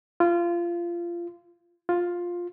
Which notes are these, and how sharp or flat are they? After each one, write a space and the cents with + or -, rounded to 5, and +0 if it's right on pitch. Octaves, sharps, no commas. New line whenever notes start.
F4 -20
F4 +10